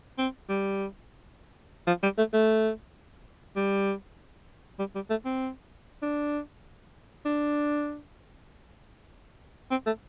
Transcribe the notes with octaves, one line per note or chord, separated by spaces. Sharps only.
C4
G3
F3
G3
A3
A3
G3
G3
G3
A3
C4
D4
D4
C4
A3